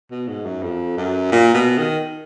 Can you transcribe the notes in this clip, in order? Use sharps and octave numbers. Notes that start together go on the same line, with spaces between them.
B2
G#2
F#2
F2
F#2
A#2
B2
D#3